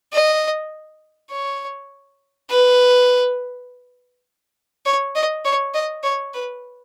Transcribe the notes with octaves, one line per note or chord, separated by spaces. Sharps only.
D#5
C#5
B4
C#5
D#5
C#5
D#5
C#5
B4